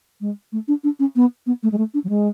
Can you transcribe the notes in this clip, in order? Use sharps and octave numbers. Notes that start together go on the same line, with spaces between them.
G#3
A3
D4
D4
C#4
B3
B3
A3
G#3
A3
D4
F#3
G#3